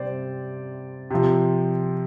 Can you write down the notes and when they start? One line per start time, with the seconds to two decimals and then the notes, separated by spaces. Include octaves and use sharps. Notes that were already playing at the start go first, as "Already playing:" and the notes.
Already playing: C3 G3 C5 D5
1.10 C3 F3